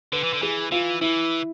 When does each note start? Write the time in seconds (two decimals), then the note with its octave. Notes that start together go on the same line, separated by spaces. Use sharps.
0.12 D3 B4
0.23 E3
0.33 D3
0.42 E3 G#4
0.71 E3 F4
1.01 E3 E4